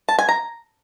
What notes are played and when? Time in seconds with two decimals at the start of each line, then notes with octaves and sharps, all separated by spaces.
0.09 A5
0.19 G#5
0.29 A#5